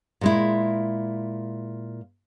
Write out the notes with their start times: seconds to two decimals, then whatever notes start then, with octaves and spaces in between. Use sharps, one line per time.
0.21 A#2 G#3 E4